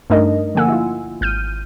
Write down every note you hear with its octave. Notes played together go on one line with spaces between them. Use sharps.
G2 A3 D4 D#4 A#4 D#5
D3 F3 A#3 F#5 G#5 E6
E4 F4
G#1 F6 G6 D#7